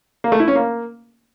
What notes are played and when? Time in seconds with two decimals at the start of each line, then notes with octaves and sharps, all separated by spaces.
0.24 A#3
0.32 A3
0.40 E4
0.48 C#4
0.55 A#3